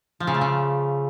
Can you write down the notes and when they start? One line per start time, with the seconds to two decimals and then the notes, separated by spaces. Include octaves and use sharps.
0.20 F3
0.27 C#3
0.34 A3
0.41 C#3